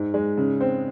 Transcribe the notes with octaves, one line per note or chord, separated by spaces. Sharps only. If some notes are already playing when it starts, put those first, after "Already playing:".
Already playing: G#2
G#3
C#3
C4